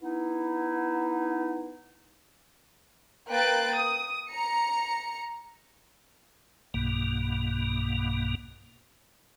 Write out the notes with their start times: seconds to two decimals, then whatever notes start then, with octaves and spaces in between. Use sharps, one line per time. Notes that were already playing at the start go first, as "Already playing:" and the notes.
0.02 B3 D#4 E4
3.28 A#3 B4 G5 F#6 A6 D7
3.75 D#6
4.30 A#5 C#7
6.74 B1 G2 B2 A#3